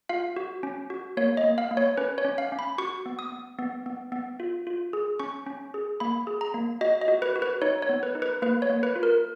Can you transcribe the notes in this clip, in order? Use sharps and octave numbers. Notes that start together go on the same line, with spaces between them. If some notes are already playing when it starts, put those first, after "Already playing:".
F4 F5
F#4
C#4
F#4
A#3 C#5
D#5
A#3
F5
A#3
C#5
C#4 B4
C#5
C#4
F5
C#4
B5
F#4 C#6
B3
D#6
B3
B3
B3
B3
F4
F4
G#4
C#4 C#6
C#4
G#4
A#3 B5
G#4
A#5
A#3
F#4 D#5
D#5
F#4
B4
F#4
B4
D#4 C#5
C#5
B3
B4
D#4
B4
A#3 B4
C#5
A#3
B4
F4
A#4